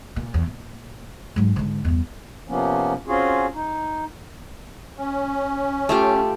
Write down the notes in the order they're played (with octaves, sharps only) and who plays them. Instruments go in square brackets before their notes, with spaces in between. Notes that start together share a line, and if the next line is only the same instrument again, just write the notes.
[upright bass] A#2
E2
A#2
G#2 F#3
G#2 D3
E2 G2
[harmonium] C3 F3 A#3 B3 C#4
C4 C#4 F4 F#4 G#4
D#4
[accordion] C#4
[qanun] A3 F4 G4